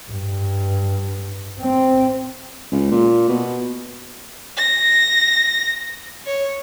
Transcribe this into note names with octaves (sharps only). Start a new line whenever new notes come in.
G2
C4
C#2
A#2
B2
A#6
C#5